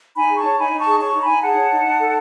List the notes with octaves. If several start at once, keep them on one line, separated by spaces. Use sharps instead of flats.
D#4 G#5 B5
G#4
A5 C#6
C#5
D#4 G#5 B5
D#4
A5 C#6
G#4
C#5 A5 C#6
D#4
G#5 B5
D#4
G#4 F#5 A5
C#5
D#4
D#4
A4